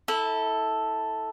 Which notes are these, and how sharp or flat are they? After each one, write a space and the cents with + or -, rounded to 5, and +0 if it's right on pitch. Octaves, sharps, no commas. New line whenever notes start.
E4 -30 A4 +0